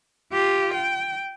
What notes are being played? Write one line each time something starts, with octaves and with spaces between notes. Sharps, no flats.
F4 G4
G5